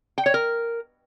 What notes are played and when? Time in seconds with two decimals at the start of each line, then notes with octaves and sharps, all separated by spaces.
0.18 G5
0.26 C#5
0.34 A#4